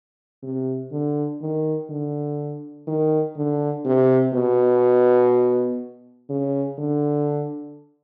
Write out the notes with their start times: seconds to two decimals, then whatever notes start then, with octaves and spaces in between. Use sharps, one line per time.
0.43 C3
0.92 D3
1.41 D#3
1.90 D3
2.88 D#3
3.36 D3
3.85 C3
4.33 B2
6.30 C#3
6.78 D3